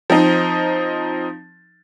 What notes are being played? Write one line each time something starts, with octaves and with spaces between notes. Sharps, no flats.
F3 C4 D#4